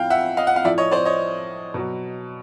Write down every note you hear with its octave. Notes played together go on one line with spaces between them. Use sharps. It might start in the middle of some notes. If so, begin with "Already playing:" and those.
Already playing: A2 F3 F5 G5
E5 F#5
D#5 F5
F#5
F5
A2 F3 D5 E5
C#5 D#5
C5 D5
C#5 D#5
B2 F#3